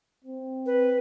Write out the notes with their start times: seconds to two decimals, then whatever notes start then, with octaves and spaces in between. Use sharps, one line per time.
0.24 C4
0.66 B4